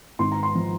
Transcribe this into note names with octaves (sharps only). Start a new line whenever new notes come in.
G#1 C6
A#5
C6
F3